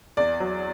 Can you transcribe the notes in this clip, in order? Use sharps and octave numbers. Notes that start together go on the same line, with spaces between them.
E2 D5
F#3